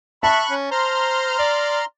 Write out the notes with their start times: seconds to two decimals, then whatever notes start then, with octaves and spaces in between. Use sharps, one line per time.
0.23 E5 A5 B5 C#6 F#6
0.50 C#4
0.71 C5 A#5 C6 F6
1.39 D5